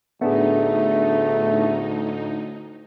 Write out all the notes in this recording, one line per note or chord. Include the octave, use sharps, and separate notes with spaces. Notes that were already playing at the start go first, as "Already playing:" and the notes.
D2 A2 A3 B3 D4 D#4 G#4